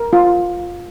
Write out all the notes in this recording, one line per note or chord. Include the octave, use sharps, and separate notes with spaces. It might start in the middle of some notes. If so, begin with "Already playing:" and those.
Already playing: A#4
F4